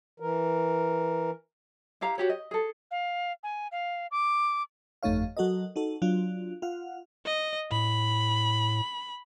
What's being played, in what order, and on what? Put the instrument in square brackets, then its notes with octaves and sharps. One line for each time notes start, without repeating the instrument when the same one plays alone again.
[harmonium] E3 A#4
[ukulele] E4 G4 F5 A#5
F#4 G4 C#5
D#5
G#4 A4
[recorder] F5
G#5
F5
D6
[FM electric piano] G1 F2 A3 D#4 C#5 F5
F#3 F#4 A4 A#4 D#5
D#4 F#4 A4
F#3 D4 F4
F4 F5 F#5
[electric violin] D#5
[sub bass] A2 [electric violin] B5